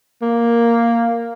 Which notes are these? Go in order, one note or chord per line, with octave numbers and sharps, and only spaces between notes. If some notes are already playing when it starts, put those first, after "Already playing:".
A#3